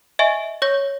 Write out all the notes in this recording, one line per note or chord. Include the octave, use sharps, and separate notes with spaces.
D#5 E5 G#5 C#6
C#5 C#6 G6 A#6